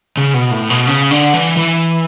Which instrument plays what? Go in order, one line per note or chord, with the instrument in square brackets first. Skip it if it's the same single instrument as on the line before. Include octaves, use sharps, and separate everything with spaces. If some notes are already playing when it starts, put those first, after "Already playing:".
[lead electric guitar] C#3
B2
A2
B2
C#3
D3
E3
E3